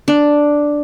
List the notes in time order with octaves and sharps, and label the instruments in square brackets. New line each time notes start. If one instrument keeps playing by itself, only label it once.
[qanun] D4